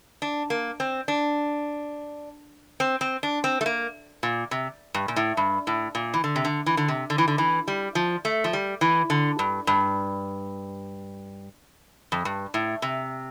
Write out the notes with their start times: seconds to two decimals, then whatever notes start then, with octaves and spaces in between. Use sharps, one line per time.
0.22 D4
0.50 A#3
0.80 C4
1.08 D4
2.80 C4
3.01 C4
3.23 D4
3.44 C4
3.61 A3
3.66 A#3
4.23 A#2
4.51 C3
4.94 G2
5.08 A#2
5.16 A2
5.37 G2
5.67 A2
5.95 A#2
6.14 E3
6.24 D3
6.36 C3
6.45 D3
6.66 E3
6.77 D3
6.88 C3
7.10 D3
7.18 E3
7.28 D3
7.38 E3
7.68 G3
7.95 F3
8.25 A3
8.44 F3
8.53 G3
8.81 E3
9.10 D3
9.39 G2
9.67 G2
12.12 F2
12.25 G2
12.54 A2
12.82 C3